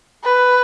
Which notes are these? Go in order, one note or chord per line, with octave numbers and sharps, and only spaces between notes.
B4